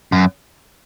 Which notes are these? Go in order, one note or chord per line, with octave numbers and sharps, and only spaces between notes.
F#2